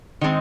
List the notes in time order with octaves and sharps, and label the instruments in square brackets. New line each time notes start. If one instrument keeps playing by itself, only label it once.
[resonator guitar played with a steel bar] D#3 G#3 C4 D#4